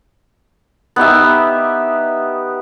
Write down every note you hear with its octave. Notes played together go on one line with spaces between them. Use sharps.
B3 D#4 G4 E5